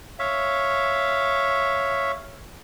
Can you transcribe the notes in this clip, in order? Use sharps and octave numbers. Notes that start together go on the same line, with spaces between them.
C#5 E5 F5